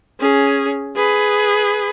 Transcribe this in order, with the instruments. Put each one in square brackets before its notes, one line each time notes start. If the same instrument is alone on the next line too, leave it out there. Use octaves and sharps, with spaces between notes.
[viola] C#4 G#4
G#4 B4